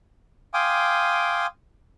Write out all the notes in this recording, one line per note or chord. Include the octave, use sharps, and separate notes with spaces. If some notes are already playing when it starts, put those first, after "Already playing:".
F5 G5 G#5 C6 D6 D#6